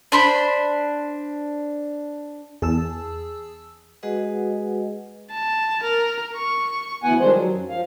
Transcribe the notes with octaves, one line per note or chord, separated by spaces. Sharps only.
D4 C5 B5
E2 G#4 A5 E6
G#3 F#4 G#4 B4 D#5 F#5
A5
A#4
C#6
D2 E3 B3 F#5 G#5
D#3 F3 G3 G#3 D4 C5
F#3
F#2
F3 F5